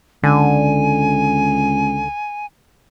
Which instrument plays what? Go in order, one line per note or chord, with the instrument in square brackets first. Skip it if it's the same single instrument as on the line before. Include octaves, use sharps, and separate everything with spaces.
[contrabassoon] C#2 [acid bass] D3 [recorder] G#5